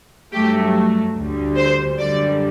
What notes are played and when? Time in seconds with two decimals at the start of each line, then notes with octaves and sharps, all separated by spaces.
0.33 G2 F#3 A3 G4
1.15 D2 D3 G3
1.57 C5
1.98 F#2 D3 G3 D5